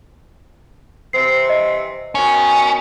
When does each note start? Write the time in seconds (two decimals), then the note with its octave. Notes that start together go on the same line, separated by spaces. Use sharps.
1.13 C3 E3 C4 C7
1.50 D#5
2.15 B2 D#3 C#4